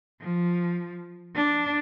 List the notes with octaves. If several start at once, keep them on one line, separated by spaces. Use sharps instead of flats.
F3
D4